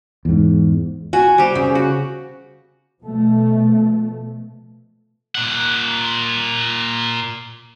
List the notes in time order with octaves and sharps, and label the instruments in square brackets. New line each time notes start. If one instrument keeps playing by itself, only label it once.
[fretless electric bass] E2 G#2
[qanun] F#4 [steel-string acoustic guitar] G#5
[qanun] G3 G4 [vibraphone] C5
[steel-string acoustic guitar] C#3
[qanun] F#4
[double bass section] B2 F3 A3
[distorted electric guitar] A#2 F#5